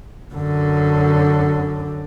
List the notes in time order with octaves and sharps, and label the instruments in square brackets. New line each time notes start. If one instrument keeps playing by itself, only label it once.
[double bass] F#2 D3